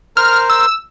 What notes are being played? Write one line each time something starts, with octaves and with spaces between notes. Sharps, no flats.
A#4 C5 F6
E6